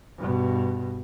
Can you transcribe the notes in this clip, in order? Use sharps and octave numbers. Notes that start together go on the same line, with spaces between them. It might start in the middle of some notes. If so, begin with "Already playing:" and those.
G2 B2